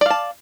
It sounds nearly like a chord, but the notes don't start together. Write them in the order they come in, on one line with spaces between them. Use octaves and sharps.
D5 F5 A5